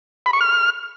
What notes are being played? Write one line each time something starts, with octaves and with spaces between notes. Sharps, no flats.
B5
C#6
F6